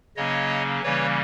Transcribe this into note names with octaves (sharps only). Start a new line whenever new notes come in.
C#3 F#3 A#3 C#4 C#5 D#5
C#3 E3 G3 A#3 C#4 B4 C#5